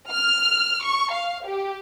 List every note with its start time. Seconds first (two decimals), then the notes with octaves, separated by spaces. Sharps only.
0.12 F6
0.84 C#6
1.13 F5
1.46 G4